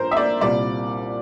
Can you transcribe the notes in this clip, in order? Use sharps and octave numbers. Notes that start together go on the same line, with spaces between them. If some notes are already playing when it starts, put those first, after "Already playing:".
Already playing: A1 G2 F3 A#4 C5
E5
D5
C2 A#2 G3 D5